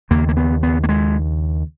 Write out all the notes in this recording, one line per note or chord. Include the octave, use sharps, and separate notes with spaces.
D#2 C#3 A#3
A#3
B3
B3
A#3
G#3